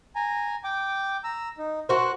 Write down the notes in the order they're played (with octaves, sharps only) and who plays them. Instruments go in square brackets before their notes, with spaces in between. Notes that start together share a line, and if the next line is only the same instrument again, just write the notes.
[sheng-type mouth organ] G#5 A#5
G5 D6
A#5 E6
D#4
[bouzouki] F#4 A#4 C5 [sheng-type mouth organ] F#6